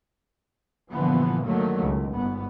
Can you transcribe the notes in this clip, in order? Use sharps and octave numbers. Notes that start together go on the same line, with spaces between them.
G1 A#2 D3 E3 F3 B3
D3 D#3 F#3 A3 A#3
C#2
G1 G#2 B3